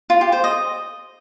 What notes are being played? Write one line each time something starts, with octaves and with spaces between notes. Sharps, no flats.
F4
G4
C5
D#5